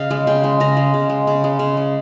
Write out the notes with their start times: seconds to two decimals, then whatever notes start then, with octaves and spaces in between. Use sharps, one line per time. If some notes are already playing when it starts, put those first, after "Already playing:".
Already playing: C#3 D#5 F5
0.10 G#3
0.27 C#3 G5
0.44 G#3
0.60 C#3 A#5
0.77 G#3
0.94 C#3
1.09 G#3
1.27 C#3
1.44 G#3
1.59 C#3
1.77 G#3